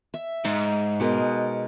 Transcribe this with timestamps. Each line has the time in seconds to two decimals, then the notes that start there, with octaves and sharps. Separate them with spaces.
0.14 E5
0.44 G#2 D#4
1.00 B2 G#3 A#4